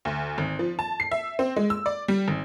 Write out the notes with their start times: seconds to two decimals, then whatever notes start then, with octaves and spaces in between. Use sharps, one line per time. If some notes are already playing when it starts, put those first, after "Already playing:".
0.05 D2
0.38 G#1
0.59 F3
0.79 A5
1.00 C7
1.11 E5
1.39 C4
1.56 G#3
1.70 E6
1.86 D5
2.08 G3
2.28 G#1